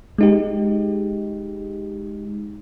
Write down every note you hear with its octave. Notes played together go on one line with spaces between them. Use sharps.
G#3 D#4 G4